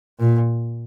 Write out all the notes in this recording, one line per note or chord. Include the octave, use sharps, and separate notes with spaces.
A#2